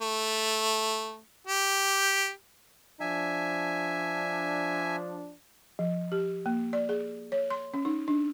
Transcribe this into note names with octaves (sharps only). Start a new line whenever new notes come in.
A3
G4
F3 D4 E5 G#5
F3
G4
A#3
D5
G#4
C#5
C6
C#4
D#4
D4